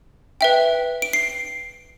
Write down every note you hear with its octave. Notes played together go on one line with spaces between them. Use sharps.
B4 E5 G5
D7
C7